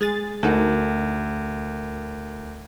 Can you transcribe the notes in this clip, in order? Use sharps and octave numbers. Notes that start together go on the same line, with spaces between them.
G#3 G#4 A6
D2 D#4 F#4 A4 A#4